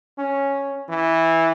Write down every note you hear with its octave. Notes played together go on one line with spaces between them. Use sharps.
C#4
E3